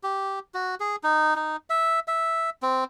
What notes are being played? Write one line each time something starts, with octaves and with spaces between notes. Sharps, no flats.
G4
F#4
G#4
D#4
D#4
E5
E5
C4